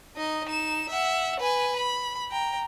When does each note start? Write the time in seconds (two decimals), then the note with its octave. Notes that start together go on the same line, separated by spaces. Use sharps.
0.16 D#4 D#5
0.45 D#4 E7
0.89 E5 F#5
1.39 B4 G#5
1.76 B5
2.31 G5 A#5